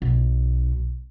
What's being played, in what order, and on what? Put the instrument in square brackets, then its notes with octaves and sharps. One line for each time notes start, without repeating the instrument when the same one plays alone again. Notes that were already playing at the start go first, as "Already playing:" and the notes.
[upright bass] B1